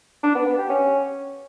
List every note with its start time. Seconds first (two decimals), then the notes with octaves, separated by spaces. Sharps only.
0.23 D4
0.35 B3
0.46 B3
0.58 G4
0.70 C#4